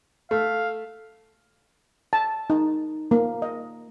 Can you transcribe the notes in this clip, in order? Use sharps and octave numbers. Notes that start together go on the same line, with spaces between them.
A3 F5
A5
D#4
A#3
D#5